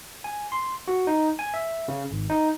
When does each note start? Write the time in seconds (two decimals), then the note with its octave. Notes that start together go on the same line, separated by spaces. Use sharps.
0.24 G#5
0.52 C6
0.88 F#4
1.07 D#4
1.39 G#5
1.54 E5
1.88 C#3
2.11 G#1
2.30 D#4